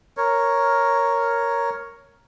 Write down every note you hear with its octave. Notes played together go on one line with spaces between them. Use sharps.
A#4 C#5